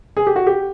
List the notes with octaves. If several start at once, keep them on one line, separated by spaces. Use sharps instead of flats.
G#4
G4
F#4
G4